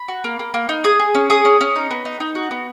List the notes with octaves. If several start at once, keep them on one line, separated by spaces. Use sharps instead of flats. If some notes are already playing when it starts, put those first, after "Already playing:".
Already playing: B5
F#4
A#3
A#3
A#3
D#4
G#4 D#6
G#4
C#4
G#4 D#6
C#4
C#4
D#4
B3
D#4
D#4
F#4
B3